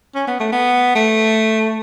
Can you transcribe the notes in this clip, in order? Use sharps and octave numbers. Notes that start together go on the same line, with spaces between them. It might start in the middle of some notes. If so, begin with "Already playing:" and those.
C#4
B3
A3
B3
A3